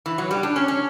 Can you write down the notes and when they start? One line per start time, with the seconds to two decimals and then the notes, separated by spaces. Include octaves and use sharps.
0.06 E3
0.18 F#3
0.31 G3
0.43 D4
0.56 C#4
0.68 C#4